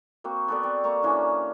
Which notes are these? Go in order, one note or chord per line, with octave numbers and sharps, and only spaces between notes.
A#3 C4 F#4
B3 A4 D5
C4 D5
A#3 A#5 C#6
E3 C#4 D4